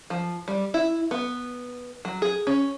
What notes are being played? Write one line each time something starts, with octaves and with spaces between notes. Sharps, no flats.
F3
G3
E4
B3
F#3
G#4
C#4